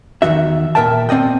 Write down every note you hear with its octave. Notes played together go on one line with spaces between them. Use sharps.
E2 D#3 F3 F#4 E5
A#2 F#3 A#4 E5 G5 A5
B3 C4 D5 D#5 G5